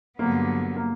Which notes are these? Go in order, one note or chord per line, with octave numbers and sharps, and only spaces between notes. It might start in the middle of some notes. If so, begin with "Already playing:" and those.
G2 D3 F#3 A#3 B3
A#3